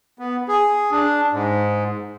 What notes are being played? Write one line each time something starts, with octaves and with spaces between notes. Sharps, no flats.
B3
G#4
D4
G#2